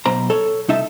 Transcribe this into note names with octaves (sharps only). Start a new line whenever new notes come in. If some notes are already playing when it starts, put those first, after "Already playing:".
B1 B2 C5 A#5
A4 C#5
C2 D#4 E5 A5